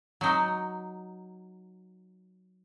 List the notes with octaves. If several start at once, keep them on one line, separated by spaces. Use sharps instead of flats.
F#3 D#4